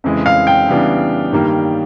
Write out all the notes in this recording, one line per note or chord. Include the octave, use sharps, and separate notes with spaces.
F2 C#3 E3 G#3
F5
G5
C#3 E3 G3 B3 D4
G2 D#3 G3 A#3